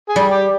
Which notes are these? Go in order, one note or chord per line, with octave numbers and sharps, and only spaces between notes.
G#4
G3
G4